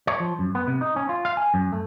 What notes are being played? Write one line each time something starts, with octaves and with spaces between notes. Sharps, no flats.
C#5
F3
F#2
B3
C3
D#4
C#4
F4
F5
G#5
F#2
A3